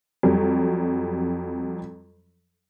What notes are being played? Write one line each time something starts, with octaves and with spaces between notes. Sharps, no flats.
F2 F#3 G3